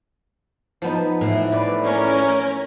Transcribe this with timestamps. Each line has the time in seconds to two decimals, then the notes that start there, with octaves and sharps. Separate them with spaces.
0.82 F3 B3 D#4
1.21 A2 E3
1.52 B4 D5
1.84 C#4 A#4